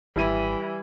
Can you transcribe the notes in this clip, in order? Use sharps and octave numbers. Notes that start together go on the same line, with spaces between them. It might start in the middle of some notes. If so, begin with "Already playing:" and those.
G#1 E3 G3 E4 D#7